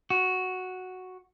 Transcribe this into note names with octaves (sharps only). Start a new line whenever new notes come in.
F#4